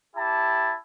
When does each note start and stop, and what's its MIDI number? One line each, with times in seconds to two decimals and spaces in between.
0.16 0.75 64
0.16 0.75 67
0.16 0.75 81